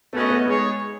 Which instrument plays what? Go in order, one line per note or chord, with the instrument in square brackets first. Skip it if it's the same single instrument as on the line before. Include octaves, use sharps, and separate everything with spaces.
[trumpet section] A3 C#4 F#4 B4 D#5 [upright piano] B3
[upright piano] B3
[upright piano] G#3 [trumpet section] B3 D#4 G#4 C#5